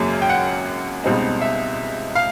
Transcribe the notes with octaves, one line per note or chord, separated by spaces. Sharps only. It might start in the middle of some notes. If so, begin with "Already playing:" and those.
Already playing: G#1 F#2 C#3 F#3 A#3
G5
F#5
C#2 B2 G3 C4 D#4
E5
F5